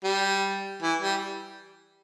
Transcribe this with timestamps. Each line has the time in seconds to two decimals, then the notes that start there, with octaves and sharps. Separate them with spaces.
0.04 G3
0.82 E3
1.02 G3